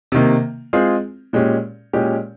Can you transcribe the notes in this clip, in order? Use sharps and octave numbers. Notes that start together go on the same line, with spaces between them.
C3 D#3 A#3
G#3 C4 F4 G#4
A#2 G#3 C#4 G4
A#2 G#3 C#4 G4